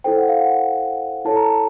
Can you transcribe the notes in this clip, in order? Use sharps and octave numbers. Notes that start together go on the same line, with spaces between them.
E4 A4 C5 G5
F#5
F5
F#5
E4 A4 C#5 A5
A#5
A5